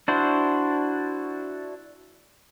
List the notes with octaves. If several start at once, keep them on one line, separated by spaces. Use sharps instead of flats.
D4 E4 F#4 C5